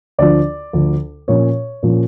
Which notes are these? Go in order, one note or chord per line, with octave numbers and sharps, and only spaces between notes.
D2 D3 F3 D5
D2 D3 F3
A#2 F3 C#4 C#5
A#2 F3 C#4